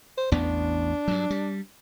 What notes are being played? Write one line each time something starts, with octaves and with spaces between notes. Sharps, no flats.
C5
A1 E2 B3 D4
G2 F#3
G3